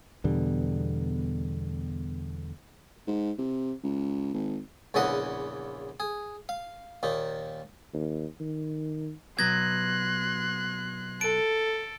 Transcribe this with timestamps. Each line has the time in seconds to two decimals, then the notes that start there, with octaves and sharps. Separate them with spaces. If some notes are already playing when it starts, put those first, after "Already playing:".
0.24 E2 B2 D3 G3
3.07 G#2
3.38 C3
3.84 C#2
4.34 G#1
4.94 A#1 E2 C#3 E3 D#5 F#5
6.00 G#4
6.49 F5
7.03 D#2 A#2 D#4
7.94 D#2
8.40 D#3
9.39 B2 F#3 B3 C6 F#6 G#6 A#6
11.21 A4 D7